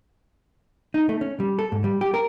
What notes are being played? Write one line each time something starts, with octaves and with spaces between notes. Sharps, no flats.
D#4
A3
C#4
G3
A4
G#2
G3
G4
A#4